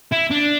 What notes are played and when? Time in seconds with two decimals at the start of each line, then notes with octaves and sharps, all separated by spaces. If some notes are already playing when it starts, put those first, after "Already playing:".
0.12 E4
0.31 D4